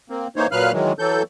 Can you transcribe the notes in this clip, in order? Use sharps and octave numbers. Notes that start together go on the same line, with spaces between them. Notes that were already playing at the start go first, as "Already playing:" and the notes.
A#3 C4
E3 A#3 D#4 C5 C#5
A#2 F#3 B4 F5 F6 F#6
D#3 E3 F#3 G#3
E3 F#3 A4 G6